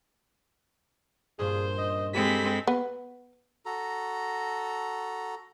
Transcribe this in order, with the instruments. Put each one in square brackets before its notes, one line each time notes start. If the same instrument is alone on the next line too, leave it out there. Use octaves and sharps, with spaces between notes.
[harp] G2 A#2 D4 [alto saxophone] G#4 [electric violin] C5
[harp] C#4 [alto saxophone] D#5
[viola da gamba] G#3 C4 [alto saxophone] G4 [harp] A4 C5 [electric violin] B5 B6
[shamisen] B3
[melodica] F#4 A4 A#5